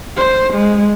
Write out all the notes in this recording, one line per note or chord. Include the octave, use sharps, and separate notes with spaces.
C5
G#3